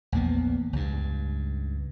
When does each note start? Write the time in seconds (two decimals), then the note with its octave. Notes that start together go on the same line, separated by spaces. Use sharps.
0.12 A#1 E2 A#3 B3
0.73 C#2 G2